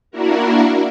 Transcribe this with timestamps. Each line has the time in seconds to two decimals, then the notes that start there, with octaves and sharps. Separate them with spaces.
0.11 A#3 D4 E4 F#4 A#4